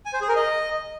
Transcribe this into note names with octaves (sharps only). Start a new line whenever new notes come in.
G#5
C5
G#4
A#4
D#5